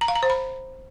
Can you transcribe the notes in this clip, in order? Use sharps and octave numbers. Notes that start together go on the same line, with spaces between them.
A#5
F5
A#5
C5
B5